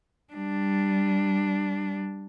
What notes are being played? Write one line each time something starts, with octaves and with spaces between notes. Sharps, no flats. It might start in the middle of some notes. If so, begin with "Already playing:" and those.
G3 D4